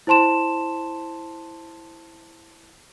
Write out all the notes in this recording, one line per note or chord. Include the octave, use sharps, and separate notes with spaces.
E4 C5 A5 C6 E7